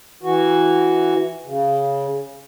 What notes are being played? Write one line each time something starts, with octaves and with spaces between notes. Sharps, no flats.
E3 F#4
C#3